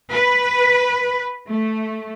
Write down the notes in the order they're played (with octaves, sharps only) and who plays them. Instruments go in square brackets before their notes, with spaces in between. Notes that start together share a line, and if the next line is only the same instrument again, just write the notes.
[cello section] B4
A3